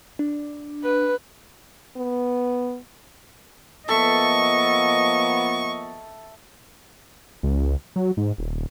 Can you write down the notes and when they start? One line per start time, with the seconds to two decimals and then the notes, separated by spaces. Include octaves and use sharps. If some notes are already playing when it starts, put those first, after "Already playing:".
0.19 D4
0.84 B4
1.96 B3
3.89 F3 A#3 B3 A4 D#5 E5 C#6
7.43 C#2
7.96 F#3
8.17 G#2
8.38 D#1